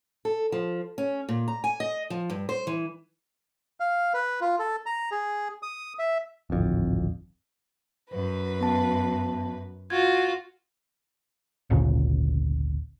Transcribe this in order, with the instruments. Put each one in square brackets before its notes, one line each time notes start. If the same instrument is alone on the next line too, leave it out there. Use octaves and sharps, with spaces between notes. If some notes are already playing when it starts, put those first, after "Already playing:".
[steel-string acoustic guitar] A4
F3
C#4
A#2
A#5
G#5
D#5
F3
G2
C5
E3
[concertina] F5
B4
F4
A4
A#5
G#4
D#6
E5
[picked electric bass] D1 G#1 F2
[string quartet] F#2 B4
[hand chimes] B3 A5
[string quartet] F4 F#4 [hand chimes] G#6
[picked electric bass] G#1 D2 A#2 C#3